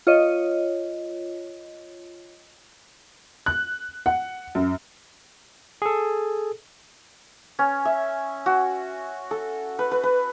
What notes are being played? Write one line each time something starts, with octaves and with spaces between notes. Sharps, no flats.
F4 C#5 D#5
F#6
F#5
F#2
G#4 A4
C#4
E5
F#4
A4
B4
B4
B4